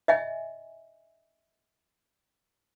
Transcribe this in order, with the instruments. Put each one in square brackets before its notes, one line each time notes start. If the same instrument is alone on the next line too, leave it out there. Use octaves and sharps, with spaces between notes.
[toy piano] D#5 E5 G#5